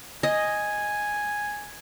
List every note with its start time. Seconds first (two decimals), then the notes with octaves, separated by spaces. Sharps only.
0.23 D#5 G#5